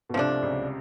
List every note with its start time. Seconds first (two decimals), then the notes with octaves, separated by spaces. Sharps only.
0.09 B2
0.14 C2 C3 F3 A3 D4
0.42 C#2 C#3